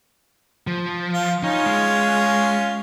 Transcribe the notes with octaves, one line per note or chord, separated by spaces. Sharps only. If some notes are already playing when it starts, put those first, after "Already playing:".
F3
F4
C#4 D#4 F4
G#3